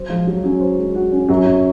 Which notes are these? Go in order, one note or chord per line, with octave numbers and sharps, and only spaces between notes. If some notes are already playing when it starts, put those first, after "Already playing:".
Already playing: F#3 C5
F3 G#3
F#3 F#4
F#3 C#4
C5
G#3
F#4
C#4
F#2 F#3
F#2